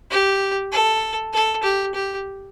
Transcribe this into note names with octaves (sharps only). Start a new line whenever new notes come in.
G4
A4
A4
G4
G4